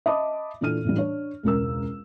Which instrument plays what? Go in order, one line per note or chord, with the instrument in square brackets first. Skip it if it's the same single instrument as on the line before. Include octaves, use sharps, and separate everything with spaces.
[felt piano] D#5 E5 A5 B5 D6 D#6
A#2 E3 D4 A4 F6 D#7
A2 E3 G3
D4 C#5
E1 C#2 A#4 E6